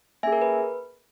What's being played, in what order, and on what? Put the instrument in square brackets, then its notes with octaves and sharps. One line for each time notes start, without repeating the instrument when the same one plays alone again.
[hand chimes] A#3 C#4 G#4 E5 G#5
A#4
B4